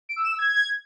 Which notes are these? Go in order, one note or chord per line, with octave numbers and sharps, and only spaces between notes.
D7
E6
E7
E6
G#6